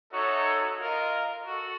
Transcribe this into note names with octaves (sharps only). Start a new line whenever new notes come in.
D#4 F#4 A4 C#5 E5
F4 A#4 D#5
F#4 A4